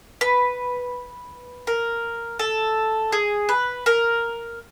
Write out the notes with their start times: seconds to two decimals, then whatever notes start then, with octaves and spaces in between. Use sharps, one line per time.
0.21 B4
1.67 A#4
2.39 A4
3.12 G#4
3.49 B4
3.86 A#4